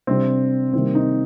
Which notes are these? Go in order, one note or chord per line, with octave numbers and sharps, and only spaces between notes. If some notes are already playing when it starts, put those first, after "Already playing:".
C3 G3 C4 D4 G4
C3 D#3 G3 A#3 C4
D#4